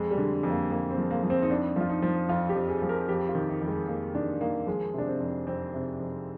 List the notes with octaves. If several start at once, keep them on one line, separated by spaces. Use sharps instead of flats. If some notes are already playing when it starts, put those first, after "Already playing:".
Already playing: F2 G#3
G3
D3
F2
A#3
F2 A#3
C4
F3
A#3
F3
C4
D#4
F2 D4
F3 F4
D#4
F3
F2 F4
G4
F2
G#4
F3
A#4
F2 G4
F4
D#3
D#4
F2
G#3
F2 A#3
D#3 D4
D#3 A#3
F3 G#3
C3 D4
C4
F2
F2 C4
C3
F2